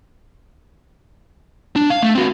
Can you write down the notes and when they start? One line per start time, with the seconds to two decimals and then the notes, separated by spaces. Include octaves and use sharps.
1.76 D4
1.90 F5
2.02 A3
2.15 C4 F#4